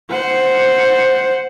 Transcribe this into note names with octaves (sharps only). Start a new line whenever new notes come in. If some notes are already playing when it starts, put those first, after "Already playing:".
C5 F#5